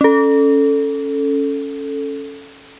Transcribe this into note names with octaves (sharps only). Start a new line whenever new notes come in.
C#4 A4